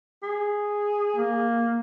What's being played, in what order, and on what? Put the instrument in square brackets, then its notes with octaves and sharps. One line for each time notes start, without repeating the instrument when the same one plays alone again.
[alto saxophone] G#4
[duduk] A#3